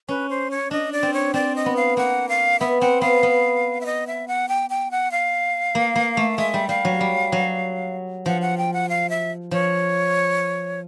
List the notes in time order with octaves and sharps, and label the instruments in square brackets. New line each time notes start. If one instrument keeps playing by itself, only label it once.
[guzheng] C#4 [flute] B4
[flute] C5
C#5
[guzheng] D4 [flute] D#5
[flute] D5
[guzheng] C4
[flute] C#5
[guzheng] C4 [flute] D5
[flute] D#5
[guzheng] B3
[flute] F5
[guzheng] A#3 [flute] F#5
[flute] F5
[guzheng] B3 [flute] E5
[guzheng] C4 [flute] F#5
[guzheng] B3 [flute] F5
[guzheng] B3
[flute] E5
D#5
E5
F#5
G5
G5
F#5
F5
[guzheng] A#3
A#3
A3
[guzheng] G#3 [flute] E5
[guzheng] G3
[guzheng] G3 [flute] F5
[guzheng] F#3
G3
F#3
[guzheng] F3 [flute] F#5
[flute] F#5
G5
F#5
F5
E5
[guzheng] F3 [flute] C#5